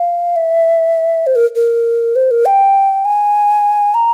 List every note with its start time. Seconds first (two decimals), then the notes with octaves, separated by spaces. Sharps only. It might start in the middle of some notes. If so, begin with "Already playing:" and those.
Already playing: F5
0.36 E5
1.27 C5
1.36 A#4
1.56 A#4
2.16 C5
2.31 A#4
2.46 G5
3.05 G#5
3.94 A#5